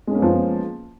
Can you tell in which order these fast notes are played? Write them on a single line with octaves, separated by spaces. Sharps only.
G#3 C#4 A#3 B3 F3